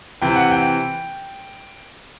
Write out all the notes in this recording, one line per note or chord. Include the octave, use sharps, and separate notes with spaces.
C3 E3 G5
F#5
G5